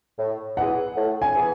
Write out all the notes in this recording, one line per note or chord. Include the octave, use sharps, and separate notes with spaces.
A2
E3 B3 E4 G#4 F#5
A2
G#5
E3 B3 E4 G#4